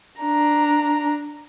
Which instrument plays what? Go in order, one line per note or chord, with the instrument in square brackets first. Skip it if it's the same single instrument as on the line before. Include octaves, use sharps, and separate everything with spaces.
[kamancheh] D4 A#5